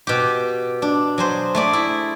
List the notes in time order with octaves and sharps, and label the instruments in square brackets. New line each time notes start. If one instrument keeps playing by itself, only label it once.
[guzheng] B2 G4
D4
F#3 G#4 C5
A3 G#4 D5
E4